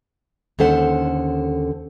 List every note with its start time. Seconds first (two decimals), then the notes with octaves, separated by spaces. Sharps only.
0.59 D#2 D3 C#4 A4 C5 F#5